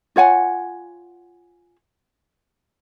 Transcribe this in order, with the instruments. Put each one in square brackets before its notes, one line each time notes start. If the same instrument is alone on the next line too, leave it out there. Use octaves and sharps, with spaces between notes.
[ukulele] F4 C#5 F#5 G#5